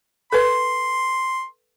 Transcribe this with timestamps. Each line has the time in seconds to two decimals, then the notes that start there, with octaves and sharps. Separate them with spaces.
0.32 A4 B4 C6